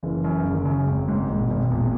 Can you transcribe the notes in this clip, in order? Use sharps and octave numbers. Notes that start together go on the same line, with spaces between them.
F#1 E3
F#2
F#1 C#3
D#3
F#2 C#3
G#1
G#2
G#1 A#2
B2
G#1
B2
E2 A#2